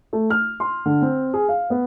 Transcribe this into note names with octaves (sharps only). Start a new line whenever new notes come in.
A3
F6
C6
D3
C4
G#4
F5
B3